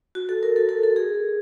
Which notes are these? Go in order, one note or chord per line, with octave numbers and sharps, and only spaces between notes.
F#4
A4
A#4
A4
A4
A4
G#4